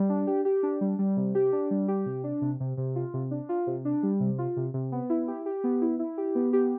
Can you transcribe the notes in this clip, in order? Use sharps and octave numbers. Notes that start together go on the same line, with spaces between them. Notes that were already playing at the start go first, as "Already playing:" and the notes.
Already playing: G3
D4
G4
G4
D4
G3
G3
C3
G4
D4
G3
G4
C3
D4
C3
C3
C3
F4
C3
D4
F4
C3
D4
G3
C3
F4
C3
C3
B3
E4
G4
G4
B3
E4
E4
G4
B3
G4